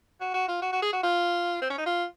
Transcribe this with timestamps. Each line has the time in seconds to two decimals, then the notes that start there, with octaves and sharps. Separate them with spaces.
0.20 F#4
0.34 F#4
0.48 F4
0.61 F#4
0.72 F#4
0.82 G#4
0.93 F#4
1.03 F4
1.61 C4
1.70 C#4
1.78 D#4
1.86 F4